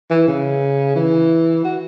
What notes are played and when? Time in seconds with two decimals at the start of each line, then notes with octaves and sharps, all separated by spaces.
0.10 E3
0.28 C#3
0.96 E3
1.64 F#4